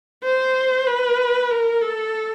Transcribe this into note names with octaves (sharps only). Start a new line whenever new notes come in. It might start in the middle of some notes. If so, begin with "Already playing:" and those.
C5
B4
A#4
A4